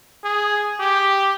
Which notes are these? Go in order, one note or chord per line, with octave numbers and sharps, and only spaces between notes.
G#4
G4